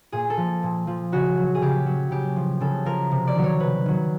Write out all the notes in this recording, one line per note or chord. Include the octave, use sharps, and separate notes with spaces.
A#2 G#4
A4
F3
A#2
F3
C#3 F#4
F#3
G#4
C#3 G4
F#3
C#3 G4
F3
C#3 A4
F3 A#4
C3
D5
D#3 F#3
C#5
C3 B4
D#3 F#3